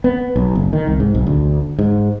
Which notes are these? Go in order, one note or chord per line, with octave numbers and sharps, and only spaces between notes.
B3
B1
F#1
D#3
C2
G#2
B1
D2
G#2